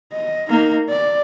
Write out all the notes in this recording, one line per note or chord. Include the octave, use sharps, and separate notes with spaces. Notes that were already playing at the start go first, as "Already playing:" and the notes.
D#5
A#3 D#4
D5